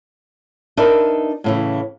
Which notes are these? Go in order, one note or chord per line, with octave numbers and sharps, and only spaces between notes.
D4 D#4 A#4 B4 D5 E5
A2 C#3 E3